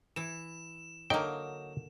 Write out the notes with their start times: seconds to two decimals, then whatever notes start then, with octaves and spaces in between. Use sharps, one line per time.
0.16 E3 E4 E7
1.10 D3 F#3 A#3 D#4 G5